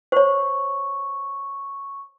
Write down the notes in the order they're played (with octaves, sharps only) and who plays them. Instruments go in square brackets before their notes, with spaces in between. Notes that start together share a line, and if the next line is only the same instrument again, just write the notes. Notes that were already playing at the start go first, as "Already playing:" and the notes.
[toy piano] C5 C#5 [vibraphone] C#6